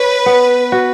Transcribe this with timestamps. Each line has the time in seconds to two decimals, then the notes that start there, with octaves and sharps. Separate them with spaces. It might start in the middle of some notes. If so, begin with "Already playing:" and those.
Already playing: B4 C#5
0.26 B3
0.72 F#4